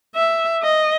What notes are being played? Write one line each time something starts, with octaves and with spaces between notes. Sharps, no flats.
E5
D#5